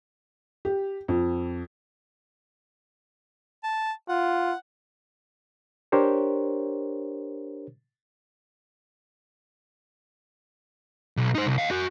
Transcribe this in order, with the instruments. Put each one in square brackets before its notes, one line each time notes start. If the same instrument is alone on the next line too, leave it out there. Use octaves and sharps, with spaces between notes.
[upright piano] G4
F2
[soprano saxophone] A5
[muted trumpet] F4 [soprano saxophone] F#5
[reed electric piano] D4 G4 A#4 C5 C#5
[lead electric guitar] B1
D#4 C5
C2
D#5 F5
F#4 G#5